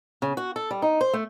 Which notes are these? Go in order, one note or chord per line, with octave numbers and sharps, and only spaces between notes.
C#3
F#4
A4
G3
D#4
C5
A3